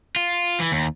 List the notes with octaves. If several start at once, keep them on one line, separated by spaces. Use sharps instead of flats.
F4
E3
D#2